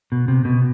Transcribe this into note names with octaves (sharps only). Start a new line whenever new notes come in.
B2
C3
B2